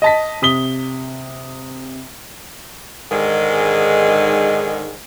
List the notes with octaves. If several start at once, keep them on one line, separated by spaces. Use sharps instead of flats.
D#5 A5 B6
C3 D#6 B6 G7
G#2 D3 D#3 G#3